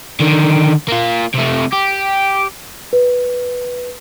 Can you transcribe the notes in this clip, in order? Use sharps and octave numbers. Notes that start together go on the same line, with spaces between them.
D3 D#3
A#3 F4
C3 A3
G4
B4